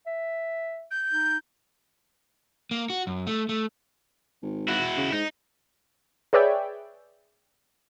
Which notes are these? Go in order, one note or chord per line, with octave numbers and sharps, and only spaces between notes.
E5
G6
D#4
A#3
F#4
F#2
A3
A3
G#1
E4 F#4
C#3
G#2 D#4
G#4 B4 C#5 D5 E5 G5